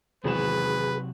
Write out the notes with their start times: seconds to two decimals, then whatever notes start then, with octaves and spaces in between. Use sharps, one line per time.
0.24 G#1 E2 C3 F#3 F#4 G#4 B4 E7